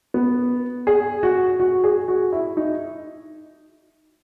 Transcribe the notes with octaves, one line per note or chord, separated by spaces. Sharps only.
B3
G#4
F#4
F#4
G#4
F#4
E4
D#4